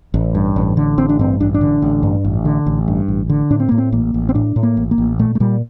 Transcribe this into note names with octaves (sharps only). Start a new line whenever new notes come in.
A1
G2
A1
D3
A1 C4
D4
G2 C4
A1 D4
D4
D3
A1
G2
A1
D3
A1
G2
A1
D3
A2 D4
C4
A2 A#3
C4
A1 A#3
A1
C4
A2 D4
A2
A#3
A1
A#3
A1
A#2 A3
A3
A#2 G3